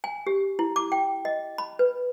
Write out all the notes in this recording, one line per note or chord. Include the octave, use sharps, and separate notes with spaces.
G#5
G4
E4
D6
G5
D#5
B5
B4